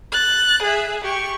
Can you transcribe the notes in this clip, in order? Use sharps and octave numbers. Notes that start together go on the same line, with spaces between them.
F#6 A6
G#4 E5
G4 C#6